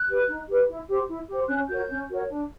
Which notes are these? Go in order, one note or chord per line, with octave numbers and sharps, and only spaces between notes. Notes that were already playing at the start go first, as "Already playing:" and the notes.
Already playing: F#6
G4 B4
D#4
G4 B4
E4
G4 C5
E4
G4 C5
C#4 F#6
F#4 A#4 C#5 G6
C#4
F#4 A#4 C#5
D4